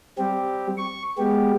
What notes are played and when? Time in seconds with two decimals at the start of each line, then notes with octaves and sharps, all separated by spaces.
0.18 G3 C4 G4
0.78 C#6
1.18 G#3 B3 G4